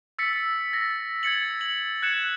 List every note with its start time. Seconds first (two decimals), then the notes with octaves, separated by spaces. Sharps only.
0.19 E6 A6 B6 C#7
0.73 A6 A#6
1.23 G#6 A6 C#7 F#7
1.61 F#7
2.02 F#6 G#6 C#7 E7